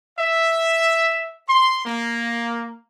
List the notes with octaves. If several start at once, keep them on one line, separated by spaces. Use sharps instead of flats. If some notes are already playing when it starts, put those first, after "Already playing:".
E5
C6
A#3